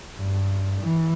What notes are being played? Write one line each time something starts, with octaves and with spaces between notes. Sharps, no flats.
G2
E3